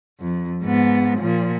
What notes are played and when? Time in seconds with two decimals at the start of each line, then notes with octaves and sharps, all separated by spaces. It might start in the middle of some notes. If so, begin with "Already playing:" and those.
0.20 F2
0.63 G#2 B3
1.19 A#2 F3